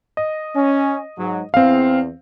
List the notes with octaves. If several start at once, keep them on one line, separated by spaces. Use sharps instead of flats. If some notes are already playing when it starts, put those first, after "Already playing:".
D#5
C#4
G#2 F#3
E2 C4 F5